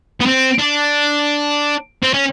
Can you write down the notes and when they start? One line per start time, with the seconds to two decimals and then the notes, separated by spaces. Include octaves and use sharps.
0.21 B3
0.26 C4
0.59 D4
2.03 C4
2.14 C#4